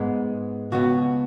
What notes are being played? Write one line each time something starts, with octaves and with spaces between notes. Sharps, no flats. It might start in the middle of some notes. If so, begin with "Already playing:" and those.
Already playing: G#2 G#3 B3
C#2 B2 B3 F#4